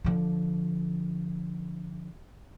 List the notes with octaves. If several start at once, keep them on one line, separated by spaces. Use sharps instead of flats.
D3 F3